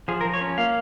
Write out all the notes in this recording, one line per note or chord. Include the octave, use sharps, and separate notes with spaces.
F3 G#4
A#4
F3
C#5
C#4
A#3 F5